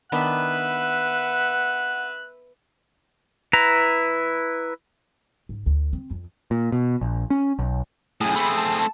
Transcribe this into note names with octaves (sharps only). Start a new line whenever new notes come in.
D#3 B3 D4 B4 E5 F#5 F#6
E4 B4 A#5
G#2
D2
C4
F2
A#2
B2
A#1
C#4
B1
F#2 A2 G#4 G#5 D#6
A3 C4 B5
A5